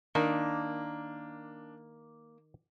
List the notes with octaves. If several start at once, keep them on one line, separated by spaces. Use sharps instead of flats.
D#3 A#3 D4